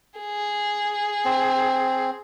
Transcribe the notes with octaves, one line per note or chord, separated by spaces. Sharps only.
G#4
C4